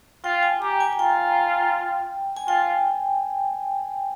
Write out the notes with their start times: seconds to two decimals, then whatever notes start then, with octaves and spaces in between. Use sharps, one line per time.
0.24 F4 G5
0.43 G#5
0.61 G4 A#5
0.80 G#5
0.93 G#5
0.99 F4 G5
2.37 G#5
2.48 F4 G5